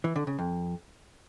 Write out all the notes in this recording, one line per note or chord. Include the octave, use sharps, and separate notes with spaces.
E3
D3
C#3
F2